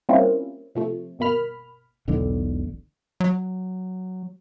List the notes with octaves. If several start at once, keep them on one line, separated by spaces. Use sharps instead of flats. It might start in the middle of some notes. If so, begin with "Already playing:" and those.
G3 A#3 C4 C#4 E4 F4
C3 F3 A3
G1 B2 A#3 B5 F6
E1 B1 A2 D3
F#3